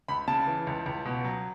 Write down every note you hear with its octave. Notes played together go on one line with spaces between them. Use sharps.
C#2 B5
C#3 A5
E3
C#2
C#2
B2
F#3